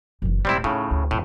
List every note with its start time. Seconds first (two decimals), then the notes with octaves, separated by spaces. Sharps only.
0.22 F#1 E3
0.45 D1 G3 G#3 C4 E4
0.64 A2 C#3 D#4
0.91 D2
1.11 F2 A2 D3